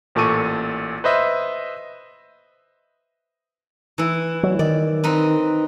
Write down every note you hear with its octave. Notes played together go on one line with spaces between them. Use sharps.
A1 A#2 A4 C#6 D#7
B4 C5 D#5 E5
E3 E4
F#3
D#3 D5
C4 D#4 B4